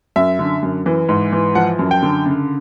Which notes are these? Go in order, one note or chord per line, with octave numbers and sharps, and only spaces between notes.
F#2 E5
D3
F#2
E3
G#2
E3
F3 F#5
F#2
G5
D3
C#3